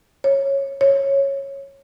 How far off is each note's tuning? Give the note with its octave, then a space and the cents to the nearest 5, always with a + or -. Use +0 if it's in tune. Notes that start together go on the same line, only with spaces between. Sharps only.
C#5 -15
C#5 -10